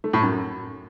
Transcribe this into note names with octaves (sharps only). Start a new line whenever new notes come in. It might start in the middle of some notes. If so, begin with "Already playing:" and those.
A3
A2
F#2